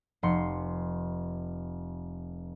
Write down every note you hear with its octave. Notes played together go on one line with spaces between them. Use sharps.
F1 C6 C#7